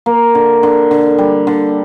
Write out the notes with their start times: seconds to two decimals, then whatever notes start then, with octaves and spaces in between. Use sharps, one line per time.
0.06 A#3
0.35 D3
0.63 D3
0.91 D3
1.18 G3
1.47 D3